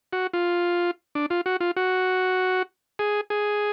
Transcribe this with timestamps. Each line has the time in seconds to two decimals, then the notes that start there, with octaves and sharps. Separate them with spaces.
0.13 F#4
0.34 F4
1.15 D4
1.30 F4
1.46 F#4
1.60 F4
1.77 F#4
2.99 G#4
3.30 G#4